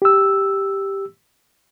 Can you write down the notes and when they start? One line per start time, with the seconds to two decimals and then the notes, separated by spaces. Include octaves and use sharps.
0.02 G4 E6